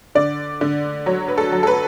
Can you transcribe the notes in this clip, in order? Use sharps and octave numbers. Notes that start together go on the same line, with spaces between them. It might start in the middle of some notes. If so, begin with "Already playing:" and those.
D3 D5
D3
F#3 C#5
B4
A4
F#3
A4
B4